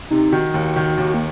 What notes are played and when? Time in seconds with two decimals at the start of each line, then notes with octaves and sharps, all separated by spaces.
0.10 C3 D#4
0.32 D#3 F#4
0.54 D#2
0.76 D#3
0.97 D#2
1.14 A#3